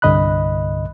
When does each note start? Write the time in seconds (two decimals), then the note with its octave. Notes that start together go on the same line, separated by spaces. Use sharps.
0.02 C2 G2 D3 D#5 B5 F#6